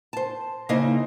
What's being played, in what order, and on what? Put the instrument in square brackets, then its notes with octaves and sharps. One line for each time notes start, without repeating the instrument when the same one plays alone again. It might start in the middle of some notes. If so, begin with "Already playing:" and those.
[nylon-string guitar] C5 A5
C#3 A#3 D#4 E4 C5 D#5